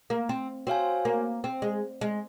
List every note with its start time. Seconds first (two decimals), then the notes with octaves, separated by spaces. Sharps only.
0.10 A#3
0.29 C4
0.67 C4 F#4 C#5 F5 G#5
1.05 A#3
1.44 C4
1.62 G#3
2.01 G#3